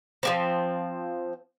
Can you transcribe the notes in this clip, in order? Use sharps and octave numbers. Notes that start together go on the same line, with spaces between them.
F3 A#3 C4